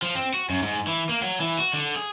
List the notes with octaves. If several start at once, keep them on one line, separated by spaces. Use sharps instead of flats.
F3
C4
F#4
F#2
G#2
E3
A#3
F#3
E3
F#4
D3
G#4